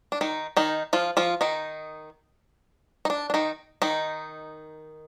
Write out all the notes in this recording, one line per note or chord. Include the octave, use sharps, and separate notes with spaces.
D4
D#3 D#4
D#3 D#4
F3 F4
F3 F4
D#3 D#4
D#4
D4
D4
D#3 D#4
D#3 D#4